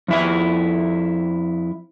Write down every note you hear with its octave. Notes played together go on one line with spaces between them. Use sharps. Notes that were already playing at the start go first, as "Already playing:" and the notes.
F2 E4 E5